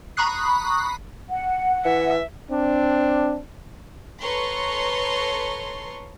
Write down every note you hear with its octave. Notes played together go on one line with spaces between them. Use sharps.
A#5 B5 C#6 D#6 F#6 C7
F#5
E3 E5
C4 D4
A4 B4 C#5 A#5 C6 C#6